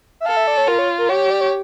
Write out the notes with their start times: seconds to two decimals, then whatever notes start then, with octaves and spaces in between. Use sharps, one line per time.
0.20 E5
0.26 A4 F5
0.37 E5
0.47 D5
0.57 C#5
0.68 F4 A#4
0.79 C#5
0.98 A#4
1.09 G4 C#5
1.30 D5
1.41 C#5